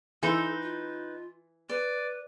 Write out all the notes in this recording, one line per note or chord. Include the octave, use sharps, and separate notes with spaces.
E3 D#4 A4 B4 C5
F4
B4 D5